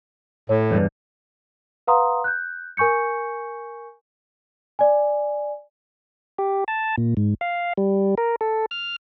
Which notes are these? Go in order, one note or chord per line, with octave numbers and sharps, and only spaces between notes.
A2 C#5
E2 G2
B4 F5 F#5 A#5 C6 D#6
F#6 G6
A#4 G#5 C#6 G6 C#7
D5 G#5
G4
A5
A#2
G#2
F5
G3
A#4
A4
F6